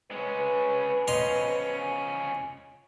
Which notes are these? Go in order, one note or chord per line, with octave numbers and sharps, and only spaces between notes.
G#3 C#4 B4
F3 C#4 D#5 A#5 C6